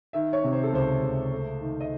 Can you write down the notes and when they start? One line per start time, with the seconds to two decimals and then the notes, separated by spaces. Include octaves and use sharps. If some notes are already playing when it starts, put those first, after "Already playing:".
0.13 D#3 E5
0.33 C#5
0.44 C3
0.53 C5
0.63 A4
0.72 C#2 C5
1.02 C#2
1.31 A3
1.61 D#3
1.80 D#5